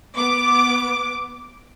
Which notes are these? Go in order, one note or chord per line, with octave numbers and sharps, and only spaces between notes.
B3 D6